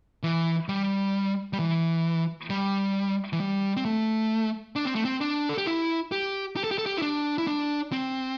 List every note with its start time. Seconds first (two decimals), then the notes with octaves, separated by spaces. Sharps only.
0.23 E3
0.69 G3
1.53 G3
1.59 E3
2.50 G3
3.33 E3
3.40 G3
3.77 C4
3.85 A3
4.76 D4
4.85 C4
4.95 A3
5.05 C4
5.21 D4
5.49 A4
5.58 G4
5.66 E4
6.12 G4
6.56 G4
6.64 A4
6.71 G4
6.78 A4
6.86 G4
6.98 E4
7.02 D4
7.38 E4
7.47 D4
7.92 C4